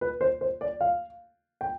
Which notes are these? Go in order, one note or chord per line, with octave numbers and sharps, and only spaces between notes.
B4
C5
C5
D5
F5
G5